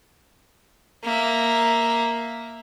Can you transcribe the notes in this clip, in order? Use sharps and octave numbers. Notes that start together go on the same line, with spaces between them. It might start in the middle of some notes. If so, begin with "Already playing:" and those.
A#3 E5